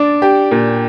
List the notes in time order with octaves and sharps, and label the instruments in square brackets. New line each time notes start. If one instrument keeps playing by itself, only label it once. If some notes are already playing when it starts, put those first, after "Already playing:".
Already playing: [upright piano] D4 [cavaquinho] D5
[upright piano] G4
A#2